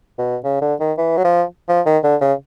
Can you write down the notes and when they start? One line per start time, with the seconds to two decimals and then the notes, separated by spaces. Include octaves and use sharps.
0.18 B2
0.44 C#3
0.61 D3
0.80 D#3
0.98 E3
1.17 F#3
1.24 F3
1.69 F3
1.85 D#3
2.03 D3
2.21 C#3